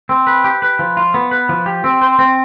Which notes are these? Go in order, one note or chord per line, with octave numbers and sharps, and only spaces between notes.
C4
B4
G4
B4
F3
F4
B3
B4
F3
G4
C4
C5
C4